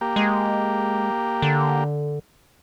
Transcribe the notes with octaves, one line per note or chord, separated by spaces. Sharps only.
A#3 G4
G#3
D3